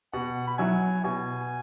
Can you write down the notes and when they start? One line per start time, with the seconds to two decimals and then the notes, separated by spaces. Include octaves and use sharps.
0.13 B2 F#5
0.48 B5
0.58 F#3 E4 G#5
1.04 B2 G#5